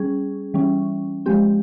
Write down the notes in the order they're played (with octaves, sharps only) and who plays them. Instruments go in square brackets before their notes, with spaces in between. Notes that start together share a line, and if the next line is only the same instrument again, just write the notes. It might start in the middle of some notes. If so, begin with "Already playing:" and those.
Already playing: [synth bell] G3 C#4 G#4
E3 G3 C#4
F3 G#3 C4 G4